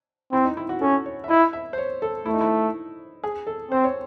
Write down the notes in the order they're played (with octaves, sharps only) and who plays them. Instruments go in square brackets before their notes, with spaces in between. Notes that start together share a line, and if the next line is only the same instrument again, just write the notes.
[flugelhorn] C4 [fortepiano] E4
[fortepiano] D#4
E4
F#4
[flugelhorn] C#4 [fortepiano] A4
[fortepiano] C#5
E5
[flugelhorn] E4 [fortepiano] D#5
[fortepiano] E5
C5
C#5
A4
[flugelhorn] A3 [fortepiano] E4
[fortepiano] D#4
E4
G#4
A4
[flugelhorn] C4 [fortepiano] C5
[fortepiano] C#5